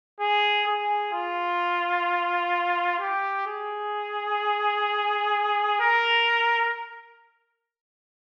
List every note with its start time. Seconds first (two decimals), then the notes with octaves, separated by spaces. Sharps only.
0.20 G#4
0.66 G#4
1.13 F4
3.00 G4
3.47 G#4
5.80 A#4